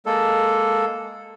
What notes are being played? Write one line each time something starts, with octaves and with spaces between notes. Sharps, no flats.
G#3 A#3 A4